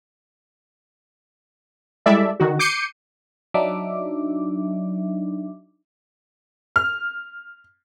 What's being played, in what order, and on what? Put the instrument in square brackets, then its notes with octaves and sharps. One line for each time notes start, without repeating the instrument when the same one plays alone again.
[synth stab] G3 G#3 E4 A4 D5 E5
D3 D#3 F#4
D6 G6 C7 C#7 D#7
[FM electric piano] F#3 D4 D#4 E5 D6
[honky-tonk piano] F6